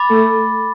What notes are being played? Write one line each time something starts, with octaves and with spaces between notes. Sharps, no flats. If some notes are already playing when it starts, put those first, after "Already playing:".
Already playing: B5 D6 A6
A3